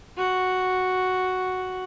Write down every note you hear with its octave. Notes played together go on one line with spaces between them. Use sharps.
F#4